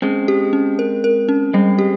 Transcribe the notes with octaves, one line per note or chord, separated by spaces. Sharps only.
G#3 C4 C#4
G4
C#4
A#4
A#4
C#4
G3 G#3 C4
G4